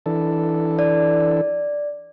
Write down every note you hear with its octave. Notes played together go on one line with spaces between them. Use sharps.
E3 D4 A4
D5